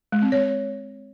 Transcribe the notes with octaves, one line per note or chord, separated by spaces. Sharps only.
G#3
C4
C#5